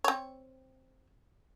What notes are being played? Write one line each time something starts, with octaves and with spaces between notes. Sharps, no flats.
C4 C#5